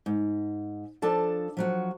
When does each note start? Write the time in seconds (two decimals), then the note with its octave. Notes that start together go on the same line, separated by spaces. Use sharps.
0.06 G#2
1.02 F3 D4 A4 A5
1.57 F3 F#3 F#4